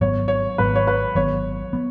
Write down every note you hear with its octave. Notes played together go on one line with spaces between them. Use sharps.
G#1 G#2 F#3 B3 C#5
C#5
G#1 G#2 F#3 B3 B4
C#5
B4
G#1 G#2 F#3 B3 C#5
F#3 B3